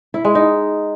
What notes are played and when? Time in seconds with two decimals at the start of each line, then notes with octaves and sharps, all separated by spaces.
0.14 E4
0.25 G#3
0.35 D#4